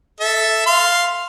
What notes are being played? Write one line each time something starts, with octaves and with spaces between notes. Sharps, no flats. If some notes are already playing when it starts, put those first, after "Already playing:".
A4 E5
F5 C6